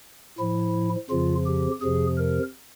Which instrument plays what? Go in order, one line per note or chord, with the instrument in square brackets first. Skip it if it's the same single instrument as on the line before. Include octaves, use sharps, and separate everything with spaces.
[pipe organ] A2 F3 E4
F2 C#3 F3 F4
G4
F2 C3 F3 G#4
A#4